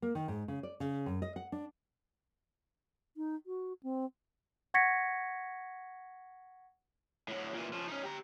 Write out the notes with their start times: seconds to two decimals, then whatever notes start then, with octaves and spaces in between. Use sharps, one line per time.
0.02 A#3
0.15 D#3
0.28 G#2
0.48 C#3
0.63 D5
0.80 C#3
1.06 F#2
1.22 D#5
1.36 F#5
1.52 D4
3.17 D#4
3.46 F#4
3.83 C4
4.74 F#5 C#6 G#6 A#6 B6 C#7
7.28 A2 F#3
7.54 A#2 E3
7.73 F3 C#4
7.88 C#4 D#4
8.03 G4 A#5